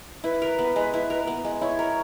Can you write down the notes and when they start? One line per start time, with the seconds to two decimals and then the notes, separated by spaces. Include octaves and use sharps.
0.24 E4 B4
0.42 A#4
0.59 B3
0.76 G#3
0.94 E4
1.10 A#4
1.27 B3
1.45 G#3
1.61 E4 C#5
1.79 A#4